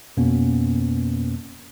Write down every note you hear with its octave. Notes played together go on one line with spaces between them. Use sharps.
F2 B2 A#3 B3 C#4